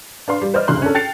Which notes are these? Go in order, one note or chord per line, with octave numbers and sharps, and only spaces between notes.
D4 B4 F5 C6
G3
B4 C5 D5 D#5 F6
F1 C#2 G2 C6 F#6
C#4 D4 A4
G5 A5 A6 C7 C#7 F7